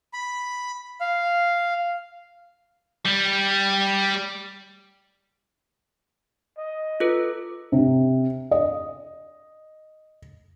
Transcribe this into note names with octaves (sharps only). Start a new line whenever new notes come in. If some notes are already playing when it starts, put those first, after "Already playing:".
B5
F5
G3
D#5
F4 A4 B4
C3
D#5